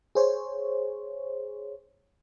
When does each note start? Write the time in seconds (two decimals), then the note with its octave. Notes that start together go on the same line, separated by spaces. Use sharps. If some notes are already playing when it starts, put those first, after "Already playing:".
0.15 G#4 C5 C#5